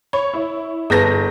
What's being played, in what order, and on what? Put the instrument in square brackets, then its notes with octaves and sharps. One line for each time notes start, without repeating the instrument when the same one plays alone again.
[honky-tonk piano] C#5 [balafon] B5
[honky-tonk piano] E4
[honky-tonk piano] G1 G6 A#6 [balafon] G#4 B4 A5